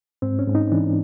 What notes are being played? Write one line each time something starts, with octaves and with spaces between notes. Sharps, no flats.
G#2 C4
C#4
G#2
D#4
E3 D4